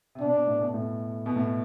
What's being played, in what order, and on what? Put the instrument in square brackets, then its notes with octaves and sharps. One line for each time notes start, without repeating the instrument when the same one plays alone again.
[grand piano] C3
[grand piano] B2 [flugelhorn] D4
[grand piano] B2
A2
B2
A2
B2
A2